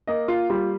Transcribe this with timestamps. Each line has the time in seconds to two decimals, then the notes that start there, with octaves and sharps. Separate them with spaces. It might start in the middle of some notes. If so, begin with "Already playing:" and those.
0.07 A#3 D#5
0.28 F4
0.50 G3 F4